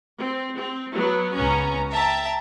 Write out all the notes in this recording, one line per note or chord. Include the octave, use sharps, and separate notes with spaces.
C4
C4
F#3 B3
C#2 B3 C#4 A#5
E5 G5 A5 A#5